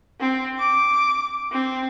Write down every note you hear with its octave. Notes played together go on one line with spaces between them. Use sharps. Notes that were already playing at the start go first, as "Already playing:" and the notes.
C4
D6
C4